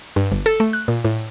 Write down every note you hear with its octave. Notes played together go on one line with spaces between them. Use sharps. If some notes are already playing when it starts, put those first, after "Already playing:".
G2
G1
A4
A3
F#6
A#2
A2